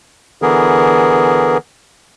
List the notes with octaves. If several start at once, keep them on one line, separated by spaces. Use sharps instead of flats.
D3 E3 B3 G#4 A#4